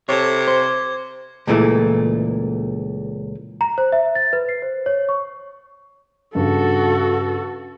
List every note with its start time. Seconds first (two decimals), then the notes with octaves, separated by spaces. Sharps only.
0.09 C3 A4 C#5 D6 G#6
0.48 C5
1.47 C#2 A#2 E3 A3
3.61 A#5
3.78 C5
3.92 E5
4.15 A6
4.33 B4
4.49 C7
4.62 C5
4.86 C#5
5.09 C#6
6.35 G2 C#3 F#4 A4